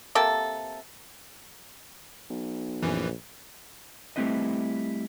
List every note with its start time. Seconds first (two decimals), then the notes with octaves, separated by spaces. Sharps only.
0.15 C3 A#3 A4
2.30 B1
2.83 A#1 F#2 E3
4.16 G3 A3 C4 E4 B4 D#5